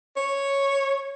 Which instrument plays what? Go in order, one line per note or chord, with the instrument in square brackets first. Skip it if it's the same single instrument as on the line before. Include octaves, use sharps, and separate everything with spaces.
[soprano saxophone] C#5